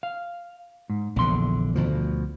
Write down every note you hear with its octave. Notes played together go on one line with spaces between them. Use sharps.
F5
G#2
A#1 E2 D3 C6
D2 B2 F3